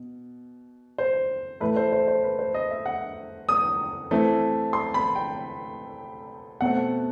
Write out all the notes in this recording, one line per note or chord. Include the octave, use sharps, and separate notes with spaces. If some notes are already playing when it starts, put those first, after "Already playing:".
Already playing: B2
C5
A2 E3 A3 B4
C5
C5
C5
B4
C5
D#5
E5
F#5
D#6
E3 A3 C4
C6
B5
G5
B2 A3 C4 F#5